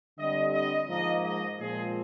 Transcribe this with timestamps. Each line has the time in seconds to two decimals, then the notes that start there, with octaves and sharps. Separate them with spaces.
0.18 D3 G3 C4 D#5
0.53 D#5
0.89 G#2 F3 A#3 D#5
1.24 D#5
1.59 A#2 F3 G#3 C4 G#4